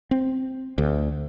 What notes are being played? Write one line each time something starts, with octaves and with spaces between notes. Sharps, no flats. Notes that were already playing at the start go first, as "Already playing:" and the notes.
C4
D2